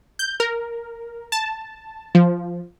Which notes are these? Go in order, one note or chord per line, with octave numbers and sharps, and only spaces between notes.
G6
A#4
A5
F3